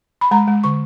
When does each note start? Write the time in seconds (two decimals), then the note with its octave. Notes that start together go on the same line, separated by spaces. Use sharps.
0.21 B5
0.31 G#3 A#5
0.48 G#3
0.64 D3 C#6